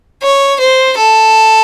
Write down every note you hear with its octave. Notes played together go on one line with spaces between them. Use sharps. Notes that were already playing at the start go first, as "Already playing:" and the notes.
C#5
C5
A4